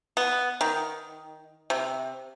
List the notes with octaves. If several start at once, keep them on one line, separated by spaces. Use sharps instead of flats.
B3
D#3
C3